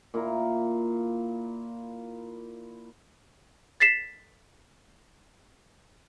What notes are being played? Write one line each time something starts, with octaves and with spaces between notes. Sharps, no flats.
A#2 E4 A#4
A6 B6 C7 E7